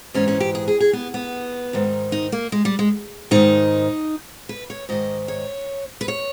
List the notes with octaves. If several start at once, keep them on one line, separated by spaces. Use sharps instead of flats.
G#2 E3 C#4
C#4
G4
G#4
G#4
G#4
B3
B3
G#2 D#3
D#4
A#3
G#3
G3
G#3
G#2 D#3 D#4
B4
C#5
G#2 D#3 D#5
C#5
B4
C#5